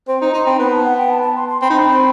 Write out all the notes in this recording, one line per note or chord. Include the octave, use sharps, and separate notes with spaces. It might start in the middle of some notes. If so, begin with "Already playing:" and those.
C4 C5
D#4
D#4 C6
C4 B5
B3 B5
A5
F#5
G5
A5
A5
C6
C6
C4 B5
D#4
C4